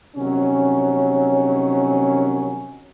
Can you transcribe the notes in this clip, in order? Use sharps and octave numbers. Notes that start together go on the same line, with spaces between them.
A#1 C3 D#3 F#3 C#4